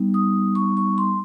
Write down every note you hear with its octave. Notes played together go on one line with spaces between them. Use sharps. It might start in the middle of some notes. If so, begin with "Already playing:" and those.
Already playing: G3 B3 D#4
D#6
C#6
C#6
C6